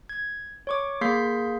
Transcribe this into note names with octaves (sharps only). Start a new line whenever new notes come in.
G#6
C#5 C#6 D6
A#3 G#4 C6 G6 B6 C7